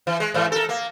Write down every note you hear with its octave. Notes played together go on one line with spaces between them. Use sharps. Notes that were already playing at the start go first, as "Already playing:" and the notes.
E3
G#3
G#2 E3
A4 A#4
A#3